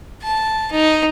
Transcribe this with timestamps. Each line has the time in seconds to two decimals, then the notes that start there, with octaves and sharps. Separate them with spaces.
0.23 A5
0.72 D#4